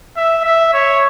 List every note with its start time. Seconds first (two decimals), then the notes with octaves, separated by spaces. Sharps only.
0.17 E5
0.44 E5
0.74 C#5